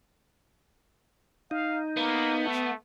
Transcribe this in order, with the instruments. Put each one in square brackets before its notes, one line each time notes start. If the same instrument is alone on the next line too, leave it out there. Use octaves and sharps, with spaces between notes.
[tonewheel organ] D#4 [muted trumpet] F5
[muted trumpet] A#3 [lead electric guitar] B3
[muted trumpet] A3